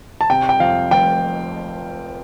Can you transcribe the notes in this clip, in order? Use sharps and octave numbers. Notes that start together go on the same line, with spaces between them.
A5
C3 G5
G5
F2 F5
F1 G5